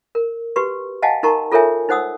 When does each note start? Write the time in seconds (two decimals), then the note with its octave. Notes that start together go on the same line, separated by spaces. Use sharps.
0.15 A#4
0.56 F#4 G4 B4 C#6
1.02 D#5 F5 F#5 G#5 A5
1.23 D#4 F#4 A#4 A5 A#5 C#6
1.52 F4 A4 A#4 C#5 E5 G#5
1.89 D#4 C5 F#5 D#6 E6